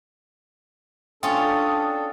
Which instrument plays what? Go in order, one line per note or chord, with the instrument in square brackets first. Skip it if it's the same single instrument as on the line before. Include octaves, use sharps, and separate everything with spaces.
[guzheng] C#4 F4 [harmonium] D4 A4 [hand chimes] G5 A6 [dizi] D#6